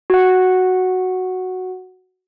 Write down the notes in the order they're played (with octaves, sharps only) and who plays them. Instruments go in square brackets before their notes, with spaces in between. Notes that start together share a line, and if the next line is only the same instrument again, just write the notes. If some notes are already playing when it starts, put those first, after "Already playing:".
[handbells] F#4 F#5